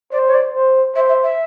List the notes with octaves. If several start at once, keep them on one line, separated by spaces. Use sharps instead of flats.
C5 D5
C#5
D5
C5
C5 E5
E5
E5